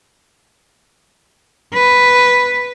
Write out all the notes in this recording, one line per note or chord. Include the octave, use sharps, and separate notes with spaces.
B4